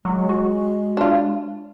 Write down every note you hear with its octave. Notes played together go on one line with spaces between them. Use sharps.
F#3 G#3
F#4
D4 F4